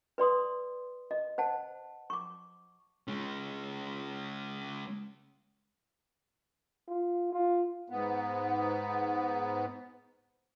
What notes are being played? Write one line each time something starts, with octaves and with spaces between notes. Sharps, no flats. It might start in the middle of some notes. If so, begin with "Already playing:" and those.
B4 D5 C6 D#6
D#5
C5 F#5 A5
C#6 D6
G#3 C#4
F4
F4
G#2 B3